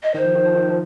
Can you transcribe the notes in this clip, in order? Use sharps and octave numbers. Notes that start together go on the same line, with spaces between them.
D#5
D#3 C5
F3
D#3
F3
D#3
F3